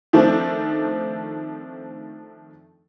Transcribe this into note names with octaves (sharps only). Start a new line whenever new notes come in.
D#3 F3 A3 C4 D4